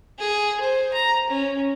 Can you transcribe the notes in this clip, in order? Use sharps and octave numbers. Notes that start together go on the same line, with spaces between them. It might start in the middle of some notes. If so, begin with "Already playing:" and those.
G#4
C5
A#5
C#4